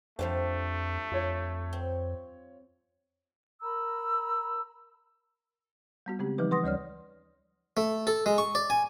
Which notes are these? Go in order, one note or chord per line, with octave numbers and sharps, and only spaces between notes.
F2 F3 G3 A3 D4 C5
F2 F4 C#5
C4
A#4 A#5 B5 E6
G3 B3 F#4
C#3 G#3 C4 G4
E3 F3 G3 D#4 B4
B4 F#5 C6 D#6 A#6
D2 G3 C#5 D5 F6
A3
A4
G#3
C#6
D5
G#5